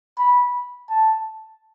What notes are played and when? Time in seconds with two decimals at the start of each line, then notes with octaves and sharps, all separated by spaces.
0.18 B5
0.90 A5